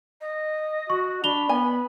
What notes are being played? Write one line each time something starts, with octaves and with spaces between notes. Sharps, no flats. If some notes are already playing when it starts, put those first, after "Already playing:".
D#5
F#4 C#6
D4 B5 F7 G7
B3 G#5